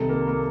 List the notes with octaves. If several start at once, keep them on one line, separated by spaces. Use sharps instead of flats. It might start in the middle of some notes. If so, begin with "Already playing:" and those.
Already playing: C2 C3 D#3 A4
A#3
A#3